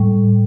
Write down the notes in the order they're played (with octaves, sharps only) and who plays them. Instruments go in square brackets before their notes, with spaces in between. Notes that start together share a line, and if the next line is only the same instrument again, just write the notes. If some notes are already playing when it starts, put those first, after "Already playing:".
Already playing: [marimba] A2 G3